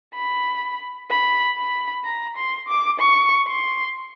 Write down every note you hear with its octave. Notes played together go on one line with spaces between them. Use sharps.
B5
B5
B5
A#5
C6
D6
C#6
C6